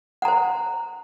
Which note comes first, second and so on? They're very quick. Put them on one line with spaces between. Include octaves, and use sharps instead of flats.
F#5 A#5 C5